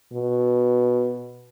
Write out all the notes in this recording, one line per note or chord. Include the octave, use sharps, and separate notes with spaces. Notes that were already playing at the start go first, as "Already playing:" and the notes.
B2